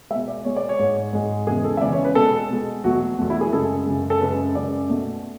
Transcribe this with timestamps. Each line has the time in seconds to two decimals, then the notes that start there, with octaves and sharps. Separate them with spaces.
0.10 G#3 E5
0.14 B2
0.28 D5
0.45 B2 G#3 C#5
0.57 D5
0.69 C#5
0.79 G#2 G#3
1.13 G#2 G#3
1.47 E2 C#3 E3 G#3 G#4
1.64 A4
1.77 E5
1.81 E2 C#3 E3 G#3 D5
1.93 C#5
2.05 B4
2.15 B2 G#3 A4
2.50 B2 G#3
2.84 E2 B2 F#3 A3 F#4
3.18 E2 B2 F#3 A3 F#4
3.30 E4
3.41 G#4
3.53 F#2 C#3 G#3 A4
3.86 F#2 C#3 G#3
4.10 A4
4.21 F#2 C#3 G#3 B4
4.55 F#2 C#3 G#3 D5
4.90 B2 A3